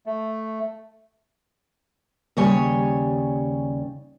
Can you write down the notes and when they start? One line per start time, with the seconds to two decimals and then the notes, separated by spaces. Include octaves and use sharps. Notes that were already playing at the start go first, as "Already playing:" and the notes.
0.06 A3
2.37 D#2 C#3 G3 C#5 G#5